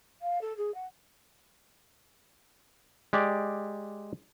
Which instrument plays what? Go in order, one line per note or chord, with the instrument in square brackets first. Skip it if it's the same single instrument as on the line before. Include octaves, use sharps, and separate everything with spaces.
[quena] F5
A4
G#4
F#5
[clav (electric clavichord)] G#3 G4 D5